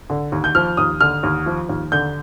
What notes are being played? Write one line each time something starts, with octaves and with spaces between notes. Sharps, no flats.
D3
D#2
G6
F3 F6
D#2 D#6
D3 F6
D#2
F3
D#2
D3 G6